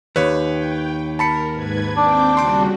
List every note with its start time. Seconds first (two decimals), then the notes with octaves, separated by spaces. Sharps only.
0.16 D#2 B4 C#5
0.49 G5
1.19 A#4 A5 B5 C#7
1.52 G#2 B4 G#6
1.96 C4 D4 G5 D6
2.37 C#3 G3 F#4 C6 D6